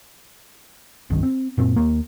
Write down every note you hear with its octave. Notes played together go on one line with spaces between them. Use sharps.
F#1 C2 G2 D#3
C4
F#2 A#2 C4
D#2 A#3